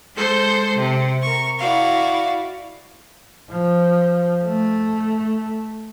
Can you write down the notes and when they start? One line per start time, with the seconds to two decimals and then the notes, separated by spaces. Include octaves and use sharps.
0.15 G#3 A4 C5 C6 G6
0.76 C3
1.21 A#4 C#6
1.59 E4 F#4 D5 F5
3.51 F3
4.43 A3